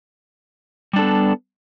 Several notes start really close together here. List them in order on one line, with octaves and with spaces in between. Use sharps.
G3 D4 A4 B3